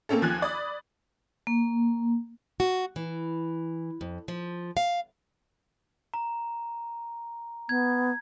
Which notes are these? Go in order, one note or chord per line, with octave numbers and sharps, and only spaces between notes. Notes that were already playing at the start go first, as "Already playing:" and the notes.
A3 A#3 C4 C#4 A4
D#2 F3 G#5 F#6 G#6
D5 B5 D#6
A#3
F#4
E3
F2
F3
F5
A#5
B3 G#6